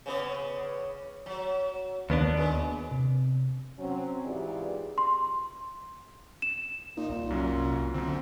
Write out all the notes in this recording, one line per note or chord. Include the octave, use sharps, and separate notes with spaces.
C#3 B3 D5
F#3
D#2 B3 D4
G#3
C3
F#3 C4 C#4
G#2 E3 F4 G4 G#4 D5
C6
E7
A#2 D#4
C2
F#2 F#3 C#4
F#2 D3 C4